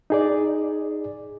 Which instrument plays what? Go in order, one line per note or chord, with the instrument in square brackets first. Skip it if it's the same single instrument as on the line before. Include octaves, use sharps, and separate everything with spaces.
[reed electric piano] D#4 G#4 D5